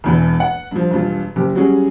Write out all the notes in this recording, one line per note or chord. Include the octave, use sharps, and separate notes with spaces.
E1 E2 E3
F#5
G2 F3
E1 G2 F4
F#1 G4
F#3 G3 C#4 F#4 G#4